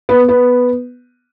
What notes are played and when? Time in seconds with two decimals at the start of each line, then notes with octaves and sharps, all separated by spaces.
0.09 B3
0.29 B3